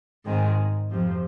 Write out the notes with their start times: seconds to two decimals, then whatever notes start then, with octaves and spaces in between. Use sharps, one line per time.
0.25 G#2 D#3 G#3 C4
0.90 F2 C3 F3